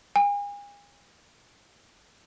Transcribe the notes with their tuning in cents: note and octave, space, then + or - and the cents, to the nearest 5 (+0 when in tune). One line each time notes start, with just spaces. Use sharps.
G#5 -40